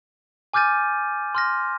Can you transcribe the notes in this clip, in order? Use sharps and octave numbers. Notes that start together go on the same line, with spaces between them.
G#5 D6 F6 G6 A6 D#7
C6 F6 A#6